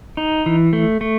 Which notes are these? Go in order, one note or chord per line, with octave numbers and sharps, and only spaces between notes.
D#4
E3
A3
A3